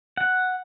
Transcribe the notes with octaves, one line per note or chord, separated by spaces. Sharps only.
F#5